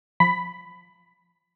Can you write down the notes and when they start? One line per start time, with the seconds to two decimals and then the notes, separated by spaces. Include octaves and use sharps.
0.20 F3 B5 B6